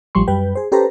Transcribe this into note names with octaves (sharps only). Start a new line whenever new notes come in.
A1 F3 G3 C6 C#6
F#2 G3 B4 G5
G#4 C5
C#4 G4 A4 B4 C5 A#5